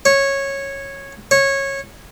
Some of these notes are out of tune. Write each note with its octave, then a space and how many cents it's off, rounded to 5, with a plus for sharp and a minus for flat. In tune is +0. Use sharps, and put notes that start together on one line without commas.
C#5 -10
C#5 -15